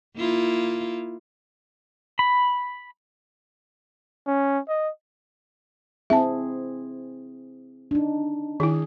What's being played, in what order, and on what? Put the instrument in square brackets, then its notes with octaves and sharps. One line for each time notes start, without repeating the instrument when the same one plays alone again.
[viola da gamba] A#3 E4 F4
[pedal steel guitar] B5
[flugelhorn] C#4
D#5
[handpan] C4 E4 G#4 [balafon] E5 A5
[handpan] D4 D#4
[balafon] D#3 E4 [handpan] G#4